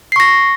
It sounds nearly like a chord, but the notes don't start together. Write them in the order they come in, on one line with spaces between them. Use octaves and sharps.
C7 C#6 A#6